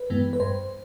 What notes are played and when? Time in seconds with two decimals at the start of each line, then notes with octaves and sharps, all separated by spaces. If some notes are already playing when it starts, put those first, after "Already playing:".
Already playing: B4
0.10 G2 E3 G#3 B3
0.33 B4
0.40 G2 C5